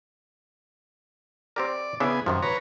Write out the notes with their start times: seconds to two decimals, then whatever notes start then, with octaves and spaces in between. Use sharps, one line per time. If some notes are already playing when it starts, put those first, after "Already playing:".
1.56 C4 G4 A#4 D5
2.00 C#3 B3 D4 E4 G#4
2.26 F#2 C3 D#3 F3
2.42 B4 C#5 A#5